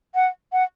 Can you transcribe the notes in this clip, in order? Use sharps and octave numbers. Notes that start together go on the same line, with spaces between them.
F#5
F#5